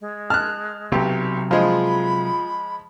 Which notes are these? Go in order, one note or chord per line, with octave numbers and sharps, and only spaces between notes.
G#3
A5 F6 F#6
B1 C3 F#3 G4
F3 G#3 F4 G#4 B5